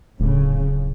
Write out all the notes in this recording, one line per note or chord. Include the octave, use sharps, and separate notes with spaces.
D1 A2 C#3